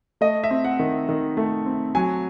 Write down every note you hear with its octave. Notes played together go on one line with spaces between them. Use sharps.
A3 D#5
E5
C4
F#5
D#3
D#3
A3
C4
F#3 G#5